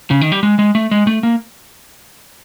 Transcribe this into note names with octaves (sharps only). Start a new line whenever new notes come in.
C#3
D#3
G3
G#3
G#3
A3
G#3
A3
A#3